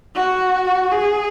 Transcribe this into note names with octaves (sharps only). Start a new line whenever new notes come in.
F#4
G#4